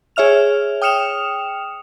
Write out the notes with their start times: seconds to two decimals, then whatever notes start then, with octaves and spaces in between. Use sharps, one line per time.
0.16 G#4 C#5 E5 F6 F7
0.82 G5 D#6 F6 C#7 E7 F7